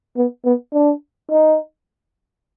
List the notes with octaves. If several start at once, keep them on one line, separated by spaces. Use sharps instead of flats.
B3
B3
D4
D#4